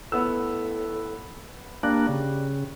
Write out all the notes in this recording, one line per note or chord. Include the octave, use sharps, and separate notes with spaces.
A2 B3 F#5 E6
G3 A#3 D4 F#6
C#3